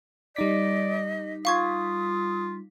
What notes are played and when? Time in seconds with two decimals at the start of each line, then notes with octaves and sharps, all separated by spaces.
0.36 G3 D#4 D5 D#5 B6
1.45 F4 F5 C#6 D#6 G#6